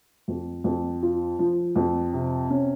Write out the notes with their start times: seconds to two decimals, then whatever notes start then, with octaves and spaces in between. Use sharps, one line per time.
0.28 F2
0.64 F2
1.03 F4
1.39 F3
1.76 F2
2.13 C3
2.50 C#4